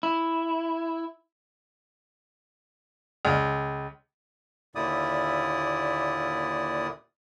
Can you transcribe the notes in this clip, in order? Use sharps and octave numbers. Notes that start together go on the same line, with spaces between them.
E4
C#2
D#2 A#2 D3 E4 D5 D#6